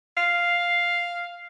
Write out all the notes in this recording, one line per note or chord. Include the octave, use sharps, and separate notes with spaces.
F5